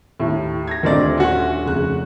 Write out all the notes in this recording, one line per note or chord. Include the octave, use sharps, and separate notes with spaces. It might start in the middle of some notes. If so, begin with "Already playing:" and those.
D#2 A2
G#6 A#6
D#1 D2 D#3 C4 D5
C#4 F#4
F1 C#3 F#6